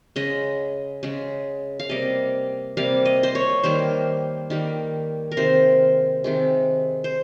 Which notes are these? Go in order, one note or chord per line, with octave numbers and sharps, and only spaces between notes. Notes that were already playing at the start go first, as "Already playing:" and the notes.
C#3 G#3 D#5
C#3 G#3
F5
C3 G3 A#3 D#5
C3 G3 A#3 F5
D#5
C5
C#5
D#3 G3 A#3 C5
D#3 G3 A#3
A#4
C3 D#3 G#3 C5
C3 D#3 G#3
C5